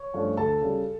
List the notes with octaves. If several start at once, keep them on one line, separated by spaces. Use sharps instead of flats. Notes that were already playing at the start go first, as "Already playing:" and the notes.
Already playing: C#5 C#6
G2 F3 A3 C#4
D2 A4 A5
C#3 G3